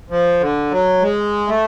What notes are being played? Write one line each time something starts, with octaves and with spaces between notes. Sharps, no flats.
F3
D3
F#3
G#3
A3